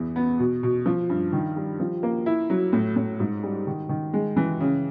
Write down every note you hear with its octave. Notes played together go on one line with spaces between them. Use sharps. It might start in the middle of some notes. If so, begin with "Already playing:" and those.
Already playing: E2 E3
B3
B2
B2
F3
G2
D#3
G3
F3
A#3
E4
F#3
A2
A2
G#2
G3
D#3
D#3
G#3
E3
C#3